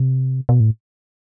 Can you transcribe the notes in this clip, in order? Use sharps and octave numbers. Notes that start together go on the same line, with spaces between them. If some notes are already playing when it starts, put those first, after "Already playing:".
Already playing: C3
B2
A2